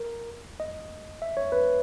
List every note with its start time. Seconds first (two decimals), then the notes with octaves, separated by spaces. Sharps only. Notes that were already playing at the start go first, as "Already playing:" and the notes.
Already playing: A#4
0.60 D#5
1.22 E5
1.37 C#5
1.52 B4